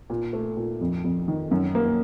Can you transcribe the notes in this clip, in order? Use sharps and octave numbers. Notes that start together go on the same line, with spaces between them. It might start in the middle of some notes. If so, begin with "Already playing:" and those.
A#2
A3
A#2
F2
F2
D#3
F#2
A#3